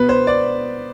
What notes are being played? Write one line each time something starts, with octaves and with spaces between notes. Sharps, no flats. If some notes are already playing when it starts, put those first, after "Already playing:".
Already playing: B2 B3 B4
C5
D5